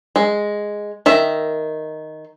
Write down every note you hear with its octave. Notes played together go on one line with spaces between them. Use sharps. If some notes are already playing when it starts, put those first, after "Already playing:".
G#3
D#3 E5